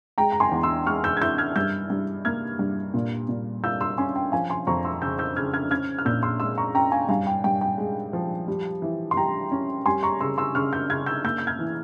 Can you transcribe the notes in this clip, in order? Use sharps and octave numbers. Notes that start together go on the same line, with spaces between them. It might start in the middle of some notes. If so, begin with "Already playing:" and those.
G#3 G5 A#5
A#5
G#5 C6
E2
C6 E6
G#3 C#6 F6
E6 G6
G#6
E4 E6 G6
F6 G#6
G2 E6 G6
G2
A#3 F6 G#6
G2
A#2
A#2
F4 E6 G6
C6 E6
C#4 G#5 C6
G5
F3 F5 G#5
G#5 C6
F2 A#5 C#6
C6 E6
C#3 E6 G6
E6 G6
C#3 F6 G#6
F6 G#6
C#4 F6 G#6
F6
A#2 E6 G6
C6 E6
G#3 C6 E6
A#5 C#6
C#4 G5 A#5
F5 G#5
G2 F5 G#5
G5
G2 G5
G5
G#3
F3
G3
E3
C6
G3 G5 A#5
C#4
G3 G#5 C6
A#5 C#6
C#3 C6 E6
C6 E6
C#3 C#6 F6
E6 G6
C#3 F6 G#6
E6 G6
A#3 E6 G6
G6
F6 G#6
E3